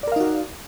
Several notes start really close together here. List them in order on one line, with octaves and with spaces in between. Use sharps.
D5 A#4 F5 D#4 F#4